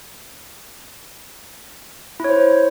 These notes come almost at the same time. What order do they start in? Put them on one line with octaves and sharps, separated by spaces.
E4 C#5 C5